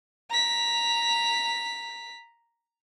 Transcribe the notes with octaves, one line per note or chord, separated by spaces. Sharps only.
A#5 B6